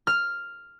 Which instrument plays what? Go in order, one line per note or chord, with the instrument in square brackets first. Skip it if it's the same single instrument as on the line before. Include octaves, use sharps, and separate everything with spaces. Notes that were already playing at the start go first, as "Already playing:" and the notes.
[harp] F6